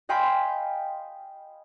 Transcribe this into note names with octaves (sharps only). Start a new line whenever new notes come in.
D#5 F5 G5 G#5 B5 C6